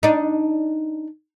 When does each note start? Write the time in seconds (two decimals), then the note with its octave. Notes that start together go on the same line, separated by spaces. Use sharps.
0.03 D4 D#4